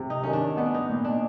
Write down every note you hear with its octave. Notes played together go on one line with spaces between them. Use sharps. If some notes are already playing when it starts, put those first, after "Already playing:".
Already playing: C3
D#4
D#3 C#4
D4
B3 D#4
D4
D#4
A#2
D4